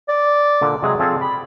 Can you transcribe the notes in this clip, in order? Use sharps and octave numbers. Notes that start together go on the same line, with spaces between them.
D5
A#2 D3
C3 F#3 G#3 G#4
F3 C4 G#4 A4
G4 B5